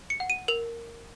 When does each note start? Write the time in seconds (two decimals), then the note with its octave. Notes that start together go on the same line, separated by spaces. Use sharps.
0.10 C#7
0.20 F#5
0.30 D#7
0.48 A#4 F7